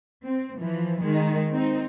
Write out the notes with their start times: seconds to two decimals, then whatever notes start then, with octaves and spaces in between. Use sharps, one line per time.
0.24 C4
0.59 E3 F3
1.02 D#3 G#3
1.52 C4 D#4